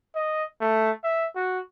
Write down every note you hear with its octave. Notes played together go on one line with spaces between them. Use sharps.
D#5
A3
E5
F#4